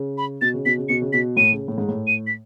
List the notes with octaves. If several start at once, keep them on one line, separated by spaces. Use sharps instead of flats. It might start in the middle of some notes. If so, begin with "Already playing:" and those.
Already playing: C#3
B5
B2 A6
C#3
B2 B6
C#3
B2 C#7
C#3
B2 B6
A2 D#7
C#3
A2
G#2
A2
D#7
B6